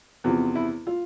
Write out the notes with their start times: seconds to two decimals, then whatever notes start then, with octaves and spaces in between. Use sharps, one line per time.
0.24 E2 C3 F3
0.55 E4
0.87 F4